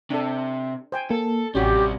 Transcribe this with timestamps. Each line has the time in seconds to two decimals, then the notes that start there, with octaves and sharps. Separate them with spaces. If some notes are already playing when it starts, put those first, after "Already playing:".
0.10 C3 D4 A4
0.92 C5 G5 G#5
1.11 A#3 A4
1.55 A1 C3 G3 C#4 F#4 G4